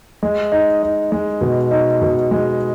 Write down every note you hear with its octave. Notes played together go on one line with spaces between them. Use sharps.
G#3
D#4
D#4
G#3
B2
D#4
B2
G#3